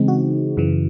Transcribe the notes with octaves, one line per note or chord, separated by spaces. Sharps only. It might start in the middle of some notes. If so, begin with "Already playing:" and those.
Already playing: C#3 E3 G#3 C4 D#4
F#4
F#2 C#3 E3